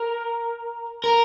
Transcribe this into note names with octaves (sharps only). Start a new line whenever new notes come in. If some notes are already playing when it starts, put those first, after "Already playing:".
Already playing: A#4
A#4